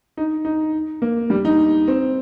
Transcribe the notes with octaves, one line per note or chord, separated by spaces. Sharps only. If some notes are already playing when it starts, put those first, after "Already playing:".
D#4
D#4
A#3
G3
D#4
C4